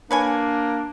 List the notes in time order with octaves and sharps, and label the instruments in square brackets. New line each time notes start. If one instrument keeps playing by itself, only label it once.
[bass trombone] A#3 [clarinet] D4 [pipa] B4 C#5 G#5